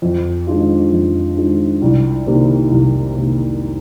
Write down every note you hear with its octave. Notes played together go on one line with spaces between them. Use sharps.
F2
D#3 G#3 D4 F4
F2
D#3 G#3 D4 F4
C2
C3 D#3 A#3
C2
C3 D#3 A#3